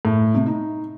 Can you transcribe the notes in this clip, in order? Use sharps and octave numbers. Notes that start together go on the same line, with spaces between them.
A2
C3
D#4